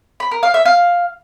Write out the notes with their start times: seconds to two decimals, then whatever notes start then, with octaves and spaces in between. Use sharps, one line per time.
0.20 B5
0.31 A#4
0.43 F5
0.54 E5
0.65 F5